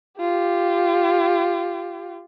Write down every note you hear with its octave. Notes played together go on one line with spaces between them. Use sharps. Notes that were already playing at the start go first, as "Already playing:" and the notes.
F4 G4